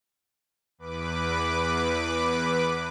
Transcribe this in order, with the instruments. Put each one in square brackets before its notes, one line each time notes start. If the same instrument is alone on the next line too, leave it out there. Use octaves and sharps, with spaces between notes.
[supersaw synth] E2 B4 D6